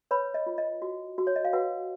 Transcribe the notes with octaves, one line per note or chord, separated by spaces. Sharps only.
B4 C#5 B5
D#5
F4
D#5
F#4
F#4
C#5
D#5
F5
F#4 B4 F#5